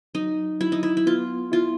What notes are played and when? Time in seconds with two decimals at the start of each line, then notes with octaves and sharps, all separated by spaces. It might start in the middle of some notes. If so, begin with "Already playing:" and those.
0.15 F#3 D#4
0.61 F#3 E4
0.72 D#4
0.83 E4
0.97 E4
1.06 B3 F4
1.52 E4 F4